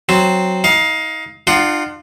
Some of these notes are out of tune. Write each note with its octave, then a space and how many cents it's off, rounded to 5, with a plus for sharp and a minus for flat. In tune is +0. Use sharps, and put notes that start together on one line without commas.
F#3 +0 C4 +0
D#4 +30 F5 +10
D4 +45 F4 +0 F#5 +20